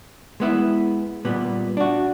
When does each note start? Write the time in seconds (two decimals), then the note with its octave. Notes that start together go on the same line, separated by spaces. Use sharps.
0.40 G#3 B3 E4
1.25 A#2 G3 B3
1.77 D4 F#4